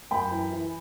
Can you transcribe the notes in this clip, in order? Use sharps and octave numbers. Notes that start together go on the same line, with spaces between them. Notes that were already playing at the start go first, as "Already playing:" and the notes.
F#2 G5 B5
E3
E3